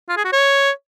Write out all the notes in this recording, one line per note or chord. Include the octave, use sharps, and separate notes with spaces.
F4
G#4
F#4
C#5